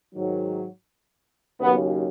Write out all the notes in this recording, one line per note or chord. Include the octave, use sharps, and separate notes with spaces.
G#2 D#3 F#3
D#2 C#3 F#3 B3